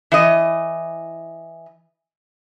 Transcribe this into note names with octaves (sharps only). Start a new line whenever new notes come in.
E3 D#5